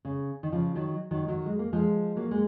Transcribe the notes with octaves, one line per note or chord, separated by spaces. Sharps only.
C#3
D#3
C#3 F3
D#3 F#3
D#3 F#3
D#3 F#3
G#3
A#3
F3 G#3
F#3 A#3
G#3